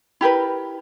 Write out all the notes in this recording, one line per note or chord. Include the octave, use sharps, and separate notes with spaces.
E4 G4 A#4 B4